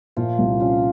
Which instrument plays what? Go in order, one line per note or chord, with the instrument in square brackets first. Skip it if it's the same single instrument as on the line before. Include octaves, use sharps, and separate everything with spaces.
[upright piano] A#2 [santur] F3 F4
[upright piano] C2
[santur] F3 F4 [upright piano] C#4